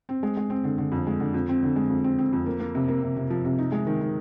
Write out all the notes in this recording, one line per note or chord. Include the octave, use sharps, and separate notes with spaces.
C4
G#3
G#3
C4
D3
D3
F2
G#3
D3
F2
C4
D3
G#3
F2
C4
C4
F2
A#3
A#3
C3
A#3
C3
C3
F3
C3
D#4
G#3
D#3
D#3